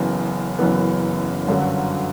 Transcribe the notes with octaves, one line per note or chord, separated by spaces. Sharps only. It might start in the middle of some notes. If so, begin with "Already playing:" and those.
Already playing: F#1 F#2 E3 B3
F#1 F#2 E3 B3
G1 F#2 D3 F#3